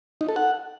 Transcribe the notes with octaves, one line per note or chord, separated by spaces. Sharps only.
D#4
A4
F#5